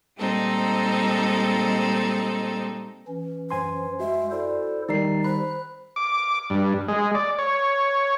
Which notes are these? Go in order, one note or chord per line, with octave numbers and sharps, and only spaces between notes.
A#2 G3 G#3 C4 D#4 A4
E3 C#4
F#2 C5 G#5 C6
G#3 F#4 E5
E4 A4 C5 D5
D#3 G3 D#4 D5 A#5 C7
C5 B5 F#6
D6
G2
G#3
D5
C#5